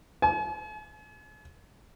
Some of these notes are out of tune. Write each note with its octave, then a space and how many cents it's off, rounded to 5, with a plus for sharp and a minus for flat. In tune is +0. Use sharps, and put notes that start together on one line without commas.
G#5 +45